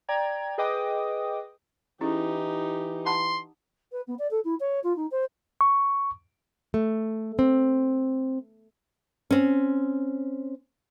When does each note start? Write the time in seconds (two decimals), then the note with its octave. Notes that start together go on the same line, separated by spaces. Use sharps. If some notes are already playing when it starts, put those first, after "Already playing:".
0.08 D5 G5 A#5 G#6
0.58 G#4 B4 D#5 G5 D6 D#6
2.01 E3 C#4 D#4 E4 G4 G#4
3.06 F#5 A5 B5 C6
3.92 B4
4.07 B3
4.19 D5
4.31 A4
4.45 E4
4.60 C#5
4.84 F4
4.96 D#4
5.11 C5
5.61 C#6
6.74 A3
7.39 C4
9.31 C4 C#4